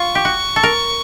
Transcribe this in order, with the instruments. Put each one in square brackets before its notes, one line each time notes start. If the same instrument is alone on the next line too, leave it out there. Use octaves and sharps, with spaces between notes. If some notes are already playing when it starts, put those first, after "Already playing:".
Already playing: [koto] F4 [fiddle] C#6
[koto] G4
F#4
A4
A#4